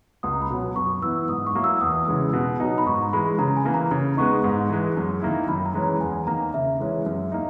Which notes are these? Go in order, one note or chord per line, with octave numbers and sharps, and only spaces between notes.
C#2 D#6
A#5
B5
B2 F#3
F#2 C#6
E3 B3 E4 E6
G#2 D#6
C#6
F#3 A#3 E4
E6
E2 D#6
C#3 E3 G#3
B2
F#3 B3 D#4
B5
G#2 C#6
A#5
E3 G#3 B5
C#3 A#5
G#5
E3 A#3
A#5
C#3
G#3 B3 D#4 C#6
G#2
E3 G#3
F#2
D#3 A#3 E4
F#2 B5
A#5
E3 G#3 C#4
A#5
E2 G#5
D#3 A#3 A#5
C#3 E5
E3 G#3 C#4
F#2
A#3 D#4